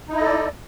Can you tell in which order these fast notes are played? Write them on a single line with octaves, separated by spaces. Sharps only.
D#4 E4 D#5 A4 D5